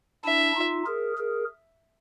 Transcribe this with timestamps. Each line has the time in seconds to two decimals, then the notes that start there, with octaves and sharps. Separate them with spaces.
0.24 D4 E4 E5
0.55 D#4 F4
0.86 G#4 A#4
1.17 G#4 A#4